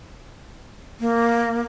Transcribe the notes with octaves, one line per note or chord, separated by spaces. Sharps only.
A#3